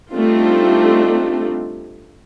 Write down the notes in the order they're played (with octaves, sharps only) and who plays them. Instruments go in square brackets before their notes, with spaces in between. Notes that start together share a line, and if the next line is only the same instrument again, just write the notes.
[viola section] G3 A3 C4 D4 D#4 F4